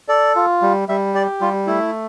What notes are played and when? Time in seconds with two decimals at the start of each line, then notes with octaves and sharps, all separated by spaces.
0.08 A4 D5
0.36 F4
0.62 G3
0.89 G3 E5
1.14 G4 D5
1.41 G3 F4
1.67 A3 E4